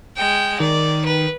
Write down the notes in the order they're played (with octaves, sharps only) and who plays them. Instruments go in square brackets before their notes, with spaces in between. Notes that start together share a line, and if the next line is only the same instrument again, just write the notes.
[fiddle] G#3 G5
[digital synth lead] D#3 [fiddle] D5
[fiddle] B4